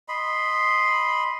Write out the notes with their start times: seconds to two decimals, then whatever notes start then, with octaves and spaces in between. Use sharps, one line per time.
0.08 D#5 B5 C6